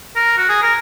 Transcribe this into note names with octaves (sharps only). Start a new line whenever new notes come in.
A#4
F#4
G#4
A#4